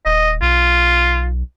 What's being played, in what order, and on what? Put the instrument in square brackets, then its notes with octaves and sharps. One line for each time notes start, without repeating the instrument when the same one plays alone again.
[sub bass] D#1 [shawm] D#5
[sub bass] B1 [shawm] F4